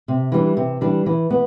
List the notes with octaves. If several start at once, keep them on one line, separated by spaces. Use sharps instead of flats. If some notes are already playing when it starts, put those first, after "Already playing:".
C3
E3 G3 D4
C3
E3 G3 D4
E3
B3